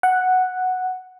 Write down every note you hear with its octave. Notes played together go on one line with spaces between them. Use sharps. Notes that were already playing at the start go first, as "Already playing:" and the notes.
F#5